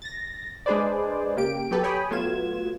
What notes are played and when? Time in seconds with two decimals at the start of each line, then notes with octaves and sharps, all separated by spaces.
0.02 A6 A#6
0.66 G#3 D4 G#4 B4 C5 D5
1.36 C#3 A#3 G4 D7
1.71 F#3 B3 G4 A4 B4
1.83 G4 C#5 G5 G#5 B5 D#6
2.11 F#3 A3 B3 F4 G#6 E7